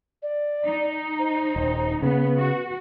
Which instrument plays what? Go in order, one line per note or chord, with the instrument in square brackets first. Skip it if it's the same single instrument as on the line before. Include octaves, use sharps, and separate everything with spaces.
[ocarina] D5
[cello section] D#4
[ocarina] C5
[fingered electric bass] D#1
[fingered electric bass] C#3 [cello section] B3 [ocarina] B4
[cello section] F#4